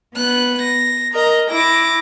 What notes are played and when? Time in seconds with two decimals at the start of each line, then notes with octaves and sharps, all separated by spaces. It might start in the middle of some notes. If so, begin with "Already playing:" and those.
0.16 B3 F#6
0.62 A#6
1.13 A#4 D#5 A#5
1.51 E4 D6 A#6